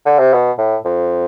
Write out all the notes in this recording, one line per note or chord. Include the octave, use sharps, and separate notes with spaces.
D3
C3
B2
A2
F2